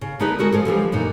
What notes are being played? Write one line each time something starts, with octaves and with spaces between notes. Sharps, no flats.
C#3
D3 B3 D#4 E4 G#4 B4
G#3 F#4 A4 A#4
F3 G#3 A4
D3 E3 F3 G3
F#2 A#2 D3 D#4